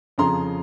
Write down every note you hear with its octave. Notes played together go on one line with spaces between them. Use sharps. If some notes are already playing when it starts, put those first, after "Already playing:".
F2 C#3 F3 A#5 C6